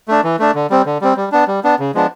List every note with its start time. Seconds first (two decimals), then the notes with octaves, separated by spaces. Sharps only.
0.08 A3 D4
0.24 E3
0.39 A3 D4
0.54 D3
0.70 G3 C4
0.86 D3
1.01 G3 C4
1.17 G3
1.32 B3 D4
1.47 G3
1.64 B3 D4
1.79 C#3
1.94 F3 G#3 B3 D4